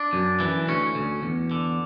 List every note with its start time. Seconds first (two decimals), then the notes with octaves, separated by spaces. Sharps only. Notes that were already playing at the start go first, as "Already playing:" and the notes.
Already playing: D4
0.13 F#2
0.40 E3
0.67 D2 C#4
0.95 D2
1.22 E2
1.51 D3